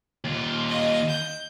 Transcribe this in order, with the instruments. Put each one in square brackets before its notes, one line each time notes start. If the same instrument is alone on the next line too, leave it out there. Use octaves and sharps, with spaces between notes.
[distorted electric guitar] D#2 F4
[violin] D#5
G6